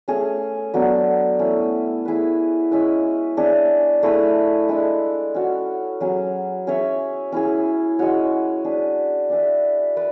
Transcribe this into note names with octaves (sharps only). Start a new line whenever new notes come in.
A3 C#4 G#4
F#3 B3 D4 A4
A3 C#4 E4
E4 G#4 B4
G#3 C#4 E4 B4
D4 G#4 C#5 E5
A3 E4 G#4 B4
G#3 D4 A4 D5
C#4 F#4 C#5
F#3 C#4 G#4
C#4 G#4 C#5 E5
C#4 E4 G#4
G#3 C#4 F#4 C#5
D4 G#4 B4
D4 G#4 B4 E5
B4 D5